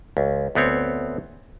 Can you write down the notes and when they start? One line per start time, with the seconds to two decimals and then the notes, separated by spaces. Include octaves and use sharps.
0.17 C#2
0.55 D2 B3 C4 C#5